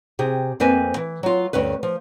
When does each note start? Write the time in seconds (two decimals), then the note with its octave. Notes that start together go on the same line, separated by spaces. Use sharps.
0.19 C3 G4 G#4
0.60 F2 A#3 C4 B4 G#5
0.96 E3
1.23 F#3 F4
1.53 D2 G2 C#4 B4
1.83 F3